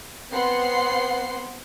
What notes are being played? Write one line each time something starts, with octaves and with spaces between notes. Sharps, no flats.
B3 C4 F#5 C6 C7